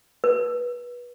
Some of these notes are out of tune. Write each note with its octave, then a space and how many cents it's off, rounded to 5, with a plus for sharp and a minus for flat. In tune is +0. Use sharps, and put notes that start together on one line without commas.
B4 -25